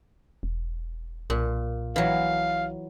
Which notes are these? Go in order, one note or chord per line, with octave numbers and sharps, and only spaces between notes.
E1
B1 A#2
E3 F#3 F5